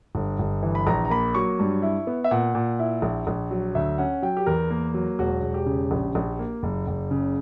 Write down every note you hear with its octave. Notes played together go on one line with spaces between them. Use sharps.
G1
G1
E3
B5
A#1 A#5
A#5
A#3 B5
F#3 C#6
G2
E4
B3
E5
A#2 F#5
A#2
E4
A#1
A#1
F#3
D2 E5
C#4 F#5
F#3 G5
G4
E2 A#4
A#3
F#3
E1 F#4
E1
G4
C#3
A#1
A#1
A#3
F#1
F#1
C#3